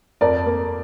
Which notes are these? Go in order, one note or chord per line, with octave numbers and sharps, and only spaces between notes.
F2 A#4 D5
A#3